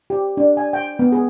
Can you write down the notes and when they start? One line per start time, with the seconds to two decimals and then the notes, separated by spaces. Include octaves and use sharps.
0.10 G4
0.37 D4
0.57 G#5
0.73 G5
0.99 B3
1.12 G#4